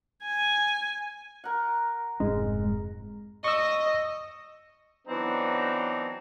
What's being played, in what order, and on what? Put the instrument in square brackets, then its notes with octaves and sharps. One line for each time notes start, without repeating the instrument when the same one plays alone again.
[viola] G#5
[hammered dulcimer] A#4 F#5
[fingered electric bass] F1 G#2 C4 [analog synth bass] G#3
[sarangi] D#5 [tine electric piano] C#6 E6
[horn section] E3 F#3 B3 C4 D4 D#4